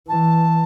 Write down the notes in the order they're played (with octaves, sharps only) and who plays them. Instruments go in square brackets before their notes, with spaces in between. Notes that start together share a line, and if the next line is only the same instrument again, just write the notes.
[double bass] E3 [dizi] A5